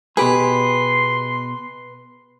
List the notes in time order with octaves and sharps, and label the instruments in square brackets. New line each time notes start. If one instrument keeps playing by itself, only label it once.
[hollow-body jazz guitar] B2 G4 G#4 [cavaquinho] B4 [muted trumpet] C6